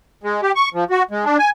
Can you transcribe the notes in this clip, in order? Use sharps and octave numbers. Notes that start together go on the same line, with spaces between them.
G#3
G4
C#6
F3
F#4
G#3
D4
G#5